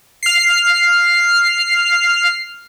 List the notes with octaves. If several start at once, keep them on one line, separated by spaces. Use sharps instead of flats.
F6 C7